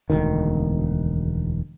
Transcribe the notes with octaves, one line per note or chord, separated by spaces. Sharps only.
E1 D2 D#3